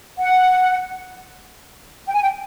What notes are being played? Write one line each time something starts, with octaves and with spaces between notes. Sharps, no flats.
F#5
G5
G#5
G5